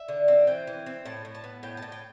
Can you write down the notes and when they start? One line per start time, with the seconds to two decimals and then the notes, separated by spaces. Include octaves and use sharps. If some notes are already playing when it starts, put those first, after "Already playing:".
Already playing: E5
0.08 D3
0.28 C4
0.47 E3 G5
0.67 E3
0.86 C4
1.05 A2 A5
1.25 A2
1.34 A5
1.44 B3
1.63 A2 G5
1.77 A5
1.82 A2
1.92 G5